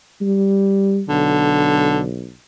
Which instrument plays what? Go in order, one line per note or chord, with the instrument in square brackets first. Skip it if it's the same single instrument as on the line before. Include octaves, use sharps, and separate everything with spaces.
[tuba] G3
[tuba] B1 [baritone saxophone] D3